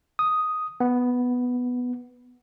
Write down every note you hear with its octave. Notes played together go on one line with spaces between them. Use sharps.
D#6
B3